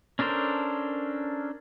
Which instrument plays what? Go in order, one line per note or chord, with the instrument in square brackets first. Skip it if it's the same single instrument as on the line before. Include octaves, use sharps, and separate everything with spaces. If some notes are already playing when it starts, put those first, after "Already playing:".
[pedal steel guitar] C#4 D4 A4 A#4 C5